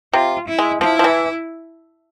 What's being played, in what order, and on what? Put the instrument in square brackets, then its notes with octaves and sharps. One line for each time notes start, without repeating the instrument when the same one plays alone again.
[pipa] C3 [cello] F4
[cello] E4
[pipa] G#3
[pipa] F3 [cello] E4
[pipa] F3
E3